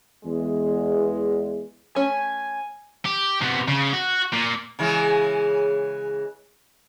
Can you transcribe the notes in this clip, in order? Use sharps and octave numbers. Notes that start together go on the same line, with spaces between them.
E2 G#3
A3 C#4 G#5
G4
C3 B3
C#3
F#4
A#2
C#3 E3 G#3